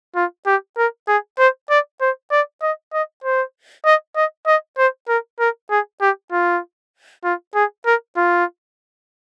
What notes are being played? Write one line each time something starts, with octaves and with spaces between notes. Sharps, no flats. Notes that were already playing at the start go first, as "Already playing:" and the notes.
F4
G4
A#4
G#4
C5
D5
C5
D5
D#5
D#5
C5
D#5
D#5
D#5
C5
A#4
A#4
G#4
G4
F4
F4
G#4
A#4
F4